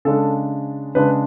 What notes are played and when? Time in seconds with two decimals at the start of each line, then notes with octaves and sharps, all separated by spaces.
0.05 C#3 G#3 D4 A4
0.95 C#3 G#3 D4 B4